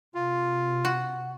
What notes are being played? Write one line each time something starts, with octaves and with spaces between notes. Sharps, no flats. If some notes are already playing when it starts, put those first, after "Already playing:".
C3 F4
F#4